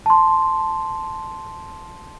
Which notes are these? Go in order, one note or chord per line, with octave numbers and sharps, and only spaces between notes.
A5 C6